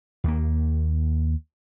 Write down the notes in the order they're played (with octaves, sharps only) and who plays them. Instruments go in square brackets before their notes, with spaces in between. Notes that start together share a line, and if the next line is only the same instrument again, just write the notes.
[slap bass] D#2 A#3